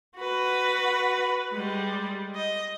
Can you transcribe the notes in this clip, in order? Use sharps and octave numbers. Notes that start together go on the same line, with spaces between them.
F#4 B4
G3 G#3
D#5